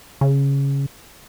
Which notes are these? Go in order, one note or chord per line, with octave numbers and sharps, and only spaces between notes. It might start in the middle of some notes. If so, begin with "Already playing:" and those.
C#3